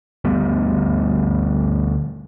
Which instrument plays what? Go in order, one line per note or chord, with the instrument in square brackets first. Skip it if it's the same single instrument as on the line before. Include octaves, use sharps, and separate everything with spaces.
[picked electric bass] D2 G3 B3